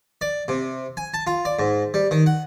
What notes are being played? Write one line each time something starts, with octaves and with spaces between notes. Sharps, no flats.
D5
C3
G#5
A5
F4
D5
G#2
G3
D#3
F#5